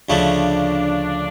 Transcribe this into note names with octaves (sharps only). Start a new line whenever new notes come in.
D2 C#3 F3 A3 D4